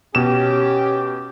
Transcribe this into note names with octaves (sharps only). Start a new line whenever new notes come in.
B2 C#4 G4 E7